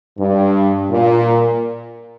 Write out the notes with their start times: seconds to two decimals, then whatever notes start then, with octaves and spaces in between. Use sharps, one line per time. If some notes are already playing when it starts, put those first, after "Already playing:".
0.18 G2
0.90 A#2